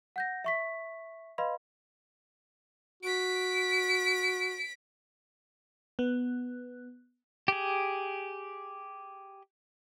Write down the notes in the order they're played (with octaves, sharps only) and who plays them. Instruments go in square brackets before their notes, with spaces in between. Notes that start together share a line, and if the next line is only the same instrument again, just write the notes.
[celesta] F#5 G6 A#6
E5 C#6 B6
B4 D#5 F5 B5 C6
[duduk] F#4 [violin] B6 D7
[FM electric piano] B3
[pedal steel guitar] G4 G#4